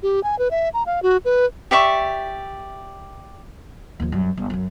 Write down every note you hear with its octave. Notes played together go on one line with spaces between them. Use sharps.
G4
G#5
B4
E5
A#5
F5
F#4
B4
G4 D5 E5 C#6
D#2 F3
F#2 G3
G1
F#2 C#4